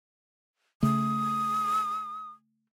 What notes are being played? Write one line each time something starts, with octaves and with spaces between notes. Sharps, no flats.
C#3 A3 D#6